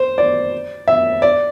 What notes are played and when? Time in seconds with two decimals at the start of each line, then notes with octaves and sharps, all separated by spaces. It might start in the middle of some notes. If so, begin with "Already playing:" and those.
Already playing: C5
0.18 D5
0.88 E5
1.22 D5